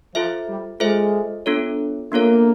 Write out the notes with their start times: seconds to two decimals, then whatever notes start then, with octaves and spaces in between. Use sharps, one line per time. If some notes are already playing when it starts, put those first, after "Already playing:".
0.15 F3 F4 A4 C5 E5
0.47 G3
0.80 G#3 F4 A4 C5 E5
1.46 B3 D4 F4 A4 C#5
2.11 A#3 B3 D4 F4 A4 C#5